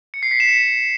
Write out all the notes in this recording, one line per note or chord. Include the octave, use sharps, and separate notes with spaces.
C#7
C7
B6
E7
C#7